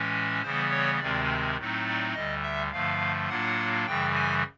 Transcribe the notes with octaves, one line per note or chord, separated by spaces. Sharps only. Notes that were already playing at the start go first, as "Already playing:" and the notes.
Already playing: A2 E3 G#3 C#4
C#3 E3 G3 B3 C5
C#5
D2 C3 D#3 G#3 C4 D5
A2 F#3 A3 C4 D#4
D5
D2 D3 G3 D#5
E5
G2 D3 F3 A3 F5
A2 F#3 A#3 D4 F4 F#5
F#2 C#3 E3 G3 G5
G#5